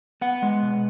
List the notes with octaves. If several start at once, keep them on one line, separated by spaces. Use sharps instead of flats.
B3 F#5
G#3
B2